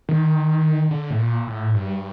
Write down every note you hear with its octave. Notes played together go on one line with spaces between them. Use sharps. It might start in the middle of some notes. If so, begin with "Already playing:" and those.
D#3
D3
A2
A#2
A2
G2